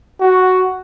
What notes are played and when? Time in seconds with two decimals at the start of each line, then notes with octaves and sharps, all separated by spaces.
0.21 F#4